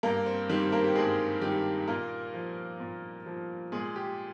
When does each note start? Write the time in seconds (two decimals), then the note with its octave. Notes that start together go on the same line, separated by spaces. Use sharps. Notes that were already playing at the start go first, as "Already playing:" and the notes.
0.03 G2 A#3 A#4
0.26 C4 C5
0.49 D#3 G3 C4 C5
0.72 A#3 A#4
0.84 G4
0.95 G2 G#3 G#4
1.41 D#3 G3 G4
1.87 A#2 A#3 A#4
2.34 F3
2.80 A#2
3.26 F3
3.72 A#2 G#3 G#4
3.96 G4